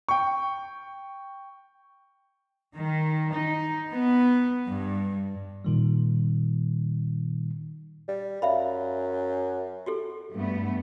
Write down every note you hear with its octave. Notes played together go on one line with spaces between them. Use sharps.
G5 C#6
D#3
D#4
B3
G2
A#2 D#3 G3
G3
F#2 E5 F5 B5
F#4 G4 A4
G2 A3 B3